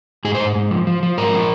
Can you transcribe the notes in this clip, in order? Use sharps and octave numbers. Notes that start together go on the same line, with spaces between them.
G#2 G#4
C5
G#2
G#2
F3
F3
F3
G#2 A#4
F3